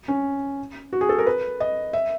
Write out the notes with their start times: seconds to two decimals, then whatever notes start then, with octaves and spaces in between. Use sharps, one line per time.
0.08 C#4
0.93 F#4
1.01 G#4
1.09 A4
1.18 A#4
1.26 B4
1.60 D#5
1.93 E5